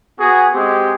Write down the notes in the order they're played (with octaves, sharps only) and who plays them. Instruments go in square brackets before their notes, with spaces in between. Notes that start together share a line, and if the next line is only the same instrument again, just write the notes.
[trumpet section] B3 F#4 G#4
G#3 C4 G4